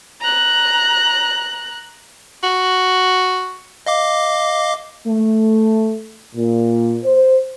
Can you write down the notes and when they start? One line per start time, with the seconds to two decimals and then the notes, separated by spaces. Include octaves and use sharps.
0.21 A#5 F#6
2.44 F#4
3.87 D#5 F5 D6
5.06 A3
6.35 A#2
7.04 C5